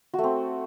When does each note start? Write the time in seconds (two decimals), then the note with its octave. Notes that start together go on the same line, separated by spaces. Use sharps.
0.14 F#4
0.19 A3
0.23 C4